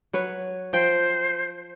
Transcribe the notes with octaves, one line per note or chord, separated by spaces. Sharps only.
F#3 B4 C#5
F3 C5 G5